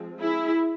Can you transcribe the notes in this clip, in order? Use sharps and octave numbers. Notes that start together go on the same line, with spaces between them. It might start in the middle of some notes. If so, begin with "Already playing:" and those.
Already playing: F3 G#3 C4
E4 G#4